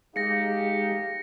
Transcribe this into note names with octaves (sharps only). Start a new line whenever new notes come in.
G#3 D#4 G4 G#4 F5 A#6 C#7